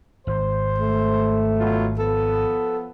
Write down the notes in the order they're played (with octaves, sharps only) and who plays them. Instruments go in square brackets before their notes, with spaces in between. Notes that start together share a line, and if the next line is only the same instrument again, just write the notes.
[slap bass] G#1 [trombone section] C5
[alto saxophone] A3
[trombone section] B2 F#3 F4
[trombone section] F3 B3 [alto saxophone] A4